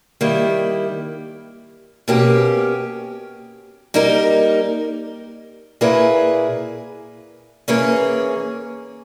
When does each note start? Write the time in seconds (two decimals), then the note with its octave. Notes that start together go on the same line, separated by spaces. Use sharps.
0.21 D#3 G3 A#3 E4
2.08 B2 A#3 C#4 G4
3.94 G3 A#3 D#4 A#4
5.81 A#2 A#3 E4 G#4 B4
7.68 E3 A#3 C#4 G#4 C#5